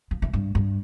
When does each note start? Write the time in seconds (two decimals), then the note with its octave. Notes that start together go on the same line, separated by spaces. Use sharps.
0.11 F3
0.22 E3
0.33 G2
0.55 G2